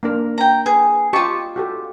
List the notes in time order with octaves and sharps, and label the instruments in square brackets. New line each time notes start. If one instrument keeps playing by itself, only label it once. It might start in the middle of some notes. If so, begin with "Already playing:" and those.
[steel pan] A#3 D4 A#4
[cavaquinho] G5 A#5
[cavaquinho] G#4 [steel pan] B4
[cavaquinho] F4 C#6 [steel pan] G4 D#5 A5
[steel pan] F#4 G4 A4